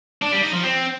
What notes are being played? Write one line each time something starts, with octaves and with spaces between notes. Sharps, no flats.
D4
G3
D#4
F3
C4